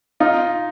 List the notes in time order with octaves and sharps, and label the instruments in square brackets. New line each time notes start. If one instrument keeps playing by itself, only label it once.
[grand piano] D#4 F4